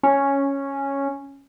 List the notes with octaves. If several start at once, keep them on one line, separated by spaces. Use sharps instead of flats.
C#4